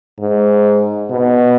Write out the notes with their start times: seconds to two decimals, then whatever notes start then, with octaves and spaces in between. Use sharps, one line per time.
0.19 G#2
1.11 B2